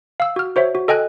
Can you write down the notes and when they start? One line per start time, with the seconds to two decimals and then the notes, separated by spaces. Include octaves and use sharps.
0.20 F5 E6
0.36 F#4 F6
0.56 F#4 C5 C#5 E5
0.75 F#4
0.88 A4 D#5 G5 G#5 F#6